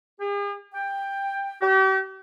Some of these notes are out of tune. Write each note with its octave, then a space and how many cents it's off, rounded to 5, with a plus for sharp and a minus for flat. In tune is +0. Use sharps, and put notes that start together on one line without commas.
G#4 -45
G5 +10
G4 -40